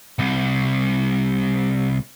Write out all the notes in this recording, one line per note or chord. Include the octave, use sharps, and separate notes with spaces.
C2 C3